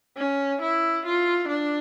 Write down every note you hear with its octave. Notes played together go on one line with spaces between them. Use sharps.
C#4
E4
F4
D4